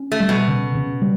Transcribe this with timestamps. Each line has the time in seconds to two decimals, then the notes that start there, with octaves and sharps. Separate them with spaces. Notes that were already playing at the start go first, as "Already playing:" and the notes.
Already playing: C#4
0.12 A3
0.20 G3
0.29 B2
0.48 C#3
0.75 C#3
1.02 G3